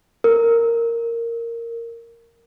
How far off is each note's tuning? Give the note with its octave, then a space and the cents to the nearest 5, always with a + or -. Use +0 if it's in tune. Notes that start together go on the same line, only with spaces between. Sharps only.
A#4 -10